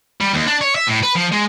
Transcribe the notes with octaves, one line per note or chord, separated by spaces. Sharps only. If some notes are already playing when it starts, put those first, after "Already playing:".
G3
D#2
D4
C#5
E5
A2
B4
F3
G#3